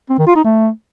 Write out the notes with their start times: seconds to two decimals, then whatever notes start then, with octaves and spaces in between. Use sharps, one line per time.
0.10 C4
0.18 D#3
0.27 F4
0.36 D#4
0.44 A3